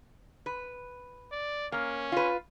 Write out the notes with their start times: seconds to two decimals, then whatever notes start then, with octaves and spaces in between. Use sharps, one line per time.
0.46 B4
1.32 D5
1.72 A#3 C#4
2.12 F4 B4